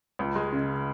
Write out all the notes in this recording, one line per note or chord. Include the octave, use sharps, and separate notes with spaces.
C#2
G#3
C#3